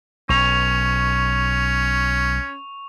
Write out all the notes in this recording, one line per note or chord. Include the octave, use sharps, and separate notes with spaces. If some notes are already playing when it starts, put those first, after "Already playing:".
B1 C#4 C#6 F7